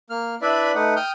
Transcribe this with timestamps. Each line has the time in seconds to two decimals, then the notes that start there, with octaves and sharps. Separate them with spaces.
0.10 A#3 F6
0.42 D4 E4 B4 D5 E5 B5
0.75 A3 D#4 B4 F#5
0.96 G5 D#6 F6 G6